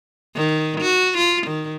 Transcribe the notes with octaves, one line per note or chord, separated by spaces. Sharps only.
D#3
F#4
F4
D#3